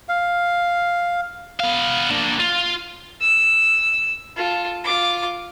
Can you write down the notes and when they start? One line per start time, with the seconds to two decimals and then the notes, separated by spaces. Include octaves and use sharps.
0.09 F5
1.60 B3 F5
2.10 A#3 D4
2.40 F4
3.21 E6
4.36 F4 A4
4.84 F4 D6